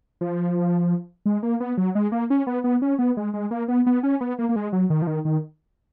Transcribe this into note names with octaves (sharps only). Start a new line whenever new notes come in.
F3
G#3
A#3
B3
F#3
G#3
A#3
C#4
B3
B3
C#4
B3
G#3
G#3
A#3
B3
B3
C#4
B3
A#3
A#3
G#3
F#3
D#3
F3
D#3
D#3